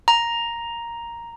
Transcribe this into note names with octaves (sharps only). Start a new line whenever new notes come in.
A#5